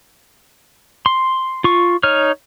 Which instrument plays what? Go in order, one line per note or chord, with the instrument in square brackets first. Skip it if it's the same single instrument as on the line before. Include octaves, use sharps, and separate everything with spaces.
[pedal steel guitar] C6
F4 C#6
D#4 C#5 F6